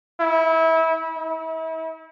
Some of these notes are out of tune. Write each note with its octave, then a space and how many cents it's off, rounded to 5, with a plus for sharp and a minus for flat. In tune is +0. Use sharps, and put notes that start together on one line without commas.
E4 -25
E4 -40